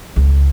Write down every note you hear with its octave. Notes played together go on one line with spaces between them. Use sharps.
C#2